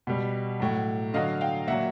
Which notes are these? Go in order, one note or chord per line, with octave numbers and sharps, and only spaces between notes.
B2 G3
A2 F#3
D3 F#3 D#5 F5
F5 G5
A#2 F#3 E5 F#5